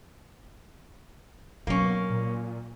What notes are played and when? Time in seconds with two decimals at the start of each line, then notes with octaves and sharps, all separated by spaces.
1.67 B2 F#3 A#3 C#4
2.10 A#2